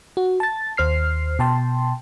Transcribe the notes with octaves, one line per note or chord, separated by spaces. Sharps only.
F#4
A5 A6
D#2 C5 F6 C7
B2 G5 A5 C6